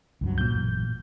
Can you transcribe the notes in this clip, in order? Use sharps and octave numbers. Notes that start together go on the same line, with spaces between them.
C#2 G2 F#3
A#2 G6
A1 F#2